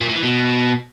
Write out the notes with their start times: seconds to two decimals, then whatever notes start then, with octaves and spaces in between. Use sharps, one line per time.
0.01 A#2
0.08 A2
0.16 E3
0.23 B2